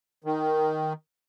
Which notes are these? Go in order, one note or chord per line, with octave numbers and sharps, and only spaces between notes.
D#3